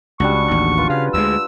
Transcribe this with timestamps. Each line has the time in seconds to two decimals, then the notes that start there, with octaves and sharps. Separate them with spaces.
0.20 C#2 G3 D4 F#4 C#6
0.51 A1 D#2
0.78 F4 B4
0.90 C#3 F5
1.14 D2 G#3 E6